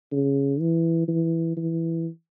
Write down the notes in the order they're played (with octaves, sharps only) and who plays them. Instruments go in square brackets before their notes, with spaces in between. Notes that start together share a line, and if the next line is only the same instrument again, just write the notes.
[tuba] C#3
E3
E3
E3